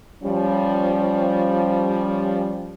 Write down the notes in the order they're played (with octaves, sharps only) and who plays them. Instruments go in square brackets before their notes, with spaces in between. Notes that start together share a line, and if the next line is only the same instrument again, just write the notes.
[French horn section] F3 G3 C#4